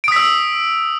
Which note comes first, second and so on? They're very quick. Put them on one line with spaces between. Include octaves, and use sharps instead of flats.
D7 D#6 B6 E6